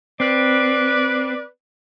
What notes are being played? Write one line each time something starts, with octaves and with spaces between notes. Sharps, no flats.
C4 B4 D5